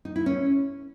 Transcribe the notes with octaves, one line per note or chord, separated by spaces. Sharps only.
D#4
E4
C#4